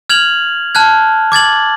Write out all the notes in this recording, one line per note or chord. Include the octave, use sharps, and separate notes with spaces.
F6 G#6 F7 F#7
A5 F6 F#6 G#6
D6 G#6 A6 F#7